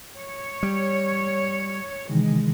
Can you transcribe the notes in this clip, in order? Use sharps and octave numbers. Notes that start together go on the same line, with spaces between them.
C#5
G3
C3 D#3 E3 G#3